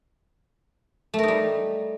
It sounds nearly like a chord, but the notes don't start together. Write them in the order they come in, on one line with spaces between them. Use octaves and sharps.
A3 A#4 D#4 G3